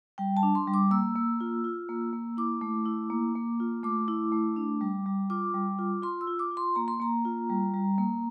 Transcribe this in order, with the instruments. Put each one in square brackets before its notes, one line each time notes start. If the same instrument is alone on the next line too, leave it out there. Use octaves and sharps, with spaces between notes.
[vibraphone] G3 G5
A5
D4
C6
G3
D6
A#3 E6
A#3
F4
F4
A#3
A#3
E4 D6
A3
E4
A#3
A#3
F4
A3 D6
E4
A3
D4
G3
G3
F4 D6
G3
F4
F4 C6
E6
F4
D6
F4
C6
A#3 A#5
C6
A#3 A#5
F4
G3
G3
A#3